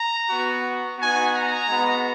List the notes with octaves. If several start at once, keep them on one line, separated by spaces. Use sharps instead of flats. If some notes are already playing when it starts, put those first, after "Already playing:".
Already playing: A#5
B3 F#4
B3 D#4 F#4 G#5
A#5
G#3 B3 F#4